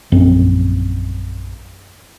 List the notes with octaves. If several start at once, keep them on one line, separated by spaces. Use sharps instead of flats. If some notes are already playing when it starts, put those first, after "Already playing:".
A#1 F#2 C4